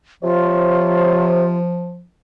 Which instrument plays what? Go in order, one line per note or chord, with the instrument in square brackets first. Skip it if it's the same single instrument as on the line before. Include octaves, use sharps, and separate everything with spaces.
[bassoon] C3 [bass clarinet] F3 [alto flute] F4 [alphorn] C#5